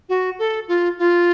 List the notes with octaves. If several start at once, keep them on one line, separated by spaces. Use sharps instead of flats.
F#4
A4
F4
F4